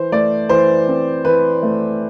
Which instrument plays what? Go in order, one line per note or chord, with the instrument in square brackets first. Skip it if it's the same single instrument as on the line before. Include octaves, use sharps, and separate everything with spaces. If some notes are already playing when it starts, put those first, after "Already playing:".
Already playing: [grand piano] E3 C5
A3 D5
E3 C5
C4
E3 B4
A3